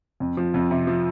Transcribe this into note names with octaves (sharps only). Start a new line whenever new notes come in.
F2
F3
F2
C3
F3